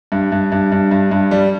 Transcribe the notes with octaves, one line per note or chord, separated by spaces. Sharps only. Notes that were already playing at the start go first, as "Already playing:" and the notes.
G2
G2
G2
G2
G2
G2
G3